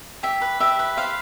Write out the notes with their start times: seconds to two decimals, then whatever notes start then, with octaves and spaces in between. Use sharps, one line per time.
0.23 G4 E5
0.41 B4
0.60 G4 E5
0.79 B4
0.97 C5 F5